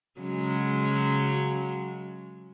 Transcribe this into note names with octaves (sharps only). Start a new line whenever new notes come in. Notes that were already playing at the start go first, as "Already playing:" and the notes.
C#3 F#3 G#3